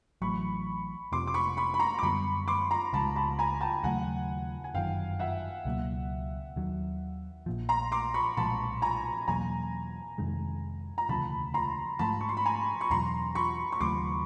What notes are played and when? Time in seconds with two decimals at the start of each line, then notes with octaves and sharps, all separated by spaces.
0.22 A1 A2 F#3 B5 C#6
1.12 F1 F2 C3 C6 D6
1.27 D6
1.34 B5 C#6
1.57 B5 C#6
1.74 B5
1.79 A#5 C6
1.98 D6
2.03 F#2 D3 G3 B3 B5 C#6
2.48 C6 D6
2.71 A#5 C6
2.93 C#2 C#3 F3 G#3 A5 B5
3.16 A5 B5
3.39 G#5 A#5
3.61 G5 A5
3.84 D#2 C#3 F#3 A3 F#5 G#5
4.64 G#5
4.74 G1 F#2 D#3 F5 G5
5.19 E5 F#5
5.65 C#2 B2 F#3 A#3
6.56 D#2 D#3 F#3
7.46 A#1 A#2 F3
7.69 A#5 C6
7.92 C6 D6
8.14 B5 C#6
8.37 B1 A#2 F3 G#3 A5 B5
8.82 G#5 A#5
9.28 E2 B2 F#3 A#3 G#5 A#5
10.18 F2 C3 D#3 G#3
10.98 A#5
11.09 E1 D2 C#3 F3 A5 B5
11.54 A#5 C6
11.99 G#2 F3 A3 A5 B5
12.21 C#6
12.29 C6
12.37 B5
12.45 G#5 A#5
12.81 C#6
12.91 E2 B2 F#3 A#5 C6
13.35 B5 C#6
13.72 C#6
13.80 D#2 C#3 F#3 A3 C6 D6